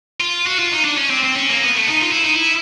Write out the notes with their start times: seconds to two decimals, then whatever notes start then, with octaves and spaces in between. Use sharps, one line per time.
0.20 F4
0.46 F#4
0.59 F4
0.72 D#4
0.85 D4
0.98 C#4
1.10 C4
1.24 C4
1.36 C#4
1.49 A#3
1.62 B3
1.75 A3
1.88 D#4
2.01 F4
2.12 E4
2.23 D#4
2.34 E4